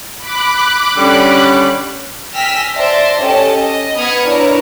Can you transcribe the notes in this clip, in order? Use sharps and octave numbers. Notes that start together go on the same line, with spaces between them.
B5 D6 F#6
D3 G3 C#4
G5 G#5 E6 F6 A#6 B6
C5 D5 E5 A5 C6 A#6
C#4 G4 A4 D#5 A5
D#5
B3 B5 D#6 F6 G#6 C#7
D4 E4 A#4 B4 C#5